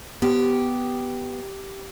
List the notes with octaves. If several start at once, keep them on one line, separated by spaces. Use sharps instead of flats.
B3 G4